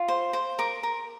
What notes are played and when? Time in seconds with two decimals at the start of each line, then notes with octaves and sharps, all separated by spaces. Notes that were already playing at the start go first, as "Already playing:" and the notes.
Already playing: F4
0.08 C5
0.33 C5
0.59 A#4 D6
0.83 A#4